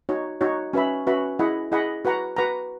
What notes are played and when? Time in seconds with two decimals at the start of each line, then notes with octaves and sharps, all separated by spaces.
0.09 D#4 F#4 C#5
0.41 D#4 F#4 C#5
0.73 C#4 F#4 B4 E5 B5
1.07 C#4 F#4 B4 E5 B5
1.39 E4 G#4 D#5 F#5 B5
1.72 E4 G#4 D#5 F#5 B5
2.05 F#4 B4 F#5 A#5
2.36 F#4 B4 F#5 A#5